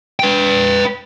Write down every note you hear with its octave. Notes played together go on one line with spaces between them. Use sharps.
B4 G5